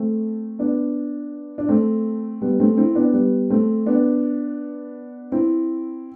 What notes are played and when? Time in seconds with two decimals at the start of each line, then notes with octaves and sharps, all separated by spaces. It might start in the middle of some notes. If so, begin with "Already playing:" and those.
Already playing: A3 C4
0.59 B3 D4
1.58 D4
1.69 A3 C4
2.42 G3 B3
2.60 A3 C4
2.77 C4 E4
2.95 B3 D4
3.13 G3 B3
3.50 A3 C4
3.86 B3 D4
5.32 C4 E4